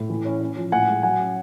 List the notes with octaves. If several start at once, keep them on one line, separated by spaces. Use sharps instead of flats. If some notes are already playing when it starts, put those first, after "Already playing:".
Already playing: A2
E3
C#4
C#4
F3
A2 F#5 G#5
G#3
F#3 F#5 G#5
C#4